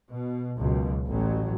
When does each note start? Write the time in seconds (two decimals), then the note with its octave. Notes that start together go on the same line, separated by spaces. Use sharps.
0.11 B2
0.58 C#2 F#2 B2
1.07 A1 F#3